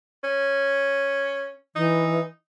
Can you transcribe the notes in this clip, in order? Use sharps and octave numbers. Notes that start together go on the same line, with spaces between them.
C#4
E3 D#4